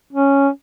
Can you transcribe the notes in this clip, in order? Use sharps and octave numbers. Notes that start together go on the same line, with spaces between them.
C#4